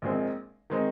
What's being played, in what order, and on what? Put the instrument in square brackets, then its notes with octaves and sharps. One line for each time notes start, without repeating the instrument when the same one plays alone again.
[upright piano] A#1 A#2 G#3 C4
D#3 G#3 C4 D#4